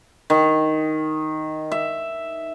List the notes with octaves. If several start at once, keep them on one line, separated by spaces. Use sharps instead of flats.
D#3
E5